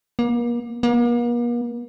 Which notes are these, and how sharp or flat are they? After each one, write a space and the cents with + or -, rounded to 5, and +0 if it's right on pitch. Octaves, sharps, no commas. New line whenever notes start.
A#3 +40
A#3 +45